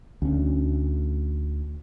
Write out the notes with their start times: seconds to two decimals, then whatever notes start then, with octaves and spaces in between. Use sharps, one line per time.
0.22 D2 C#4